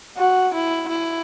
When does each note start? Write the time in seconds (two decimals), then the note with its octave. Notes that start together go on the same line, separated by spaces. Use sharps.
0.17 F#4
0.54 E4
0.90 E4